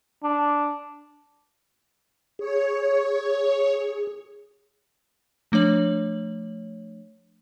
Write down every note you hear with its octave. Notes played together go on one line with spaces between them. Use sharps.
D4
G#4 C#5
F3 A3 D4 C#5 F#7